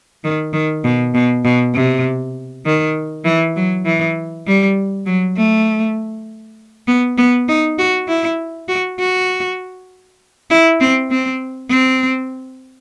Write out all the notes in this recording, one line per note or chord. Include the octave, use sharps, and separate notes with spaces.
D#3
D#3
B2
B2
B2
C3
D#3
E3
F#3
E3
G3
F#3
A3
B3
B3
D#4
F#4
E4
F#4
F#4
E4
C4
C4
C4